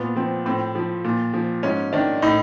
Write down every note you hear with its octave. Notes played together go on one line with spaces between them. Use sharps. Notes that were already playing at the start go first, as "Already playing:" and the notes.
Already playing: A#2 B3
F3 C4
A2 C4
F3
A#2
F3
G#2 C#4
D#3 D4
A2 D#4